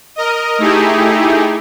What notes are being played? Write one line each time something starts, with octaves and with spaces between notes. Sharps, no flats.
A#4 D#5
A3 D#4 E4 G4 G#4